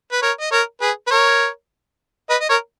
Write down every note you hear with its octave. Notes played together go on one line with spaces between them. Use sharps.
B4
A#4 C#5
D#5
A#4 C#5
G#4 B4
B4
A#4 C#5
B4 D#5
D#5
A#4 C#5